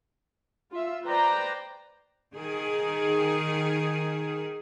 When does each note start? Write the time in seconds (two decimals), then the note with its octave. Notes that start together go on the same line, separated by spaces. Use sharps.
0.71 F4 E5
1.03 B4 C5 D5 G5 A#5
2.35 D#3 G#4